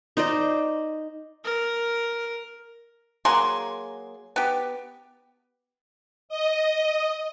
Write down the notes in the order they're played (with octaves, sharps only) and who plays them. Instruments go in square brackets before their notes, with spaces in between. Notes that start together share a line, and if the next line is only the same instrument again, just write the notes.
[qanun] D#4 C5 D5 D#5
[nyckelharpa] A#4
[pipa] F#3 A#3 G#4 C6
B3 G4
[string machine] D#5